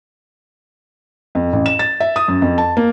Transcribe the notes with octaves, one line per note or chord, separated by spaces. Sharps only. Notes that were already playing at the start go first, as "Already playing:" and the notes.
F2
A1
E7
A6
E5
D#6
F#2
F2
A5
A#3